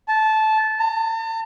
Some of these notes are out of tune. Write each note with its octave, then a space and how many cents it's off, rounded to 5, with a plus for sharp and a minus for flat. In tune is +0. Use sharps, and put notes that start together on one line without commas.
A5 -15
A5 +45